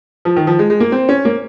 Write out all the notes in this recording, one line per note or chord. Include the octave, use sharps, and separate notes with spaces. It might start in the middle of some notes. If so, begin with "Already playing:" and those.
F3
D#3
F3
G#3
G#3
A#3
C4
C#4
A#3